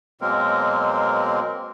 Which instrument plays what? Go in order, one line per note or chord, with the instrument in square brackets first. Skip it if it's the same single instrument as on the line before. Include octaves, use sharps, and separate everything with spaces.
[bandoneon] B2 F#3 G#3 A#3 C4 A#4